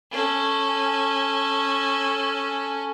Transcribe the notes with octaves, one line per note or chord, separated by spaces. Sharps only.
C#4 A4